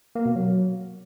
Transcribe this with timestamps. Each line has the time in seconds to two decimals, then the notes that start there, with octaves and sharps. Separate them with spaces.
0.15 A#3
0.26 B2
0.36 F#3